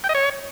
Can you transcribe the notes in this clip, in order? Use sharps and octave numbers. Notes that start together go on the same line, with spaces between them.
G5
D#5
C#5